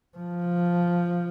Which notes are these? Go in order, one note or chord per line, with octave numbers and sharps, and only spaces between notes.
F3